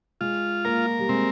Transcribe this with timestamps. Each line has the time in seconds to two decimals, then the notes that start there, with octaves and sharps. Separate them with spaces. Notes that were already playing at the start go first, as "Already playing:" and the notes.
0.21 G#3 F4
0.65 A#3 A#4
0.99 G3
1.09 G#3 C4